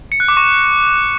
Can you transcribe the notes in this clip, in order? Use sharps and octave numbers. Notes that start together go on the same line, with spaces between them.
C#7
F#6
D6
C#6